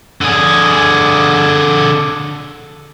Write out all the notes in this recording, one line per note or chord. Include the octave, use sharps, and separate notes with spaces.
D3 G#4